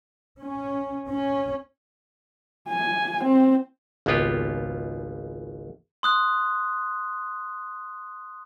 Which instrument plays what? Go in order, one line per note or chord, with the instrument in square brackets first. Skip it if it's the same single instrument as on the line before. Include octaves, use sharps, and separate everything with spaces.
[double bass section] C#4
C#4
[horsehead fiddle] G#5
C4
[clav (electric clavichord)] G#1 C#2 A#3 B3 F4 G4
[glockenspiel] C6 D#6 F#6